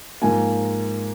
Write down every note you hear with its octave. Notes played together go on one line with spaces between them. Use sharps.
G#2 F3 A#3 G#5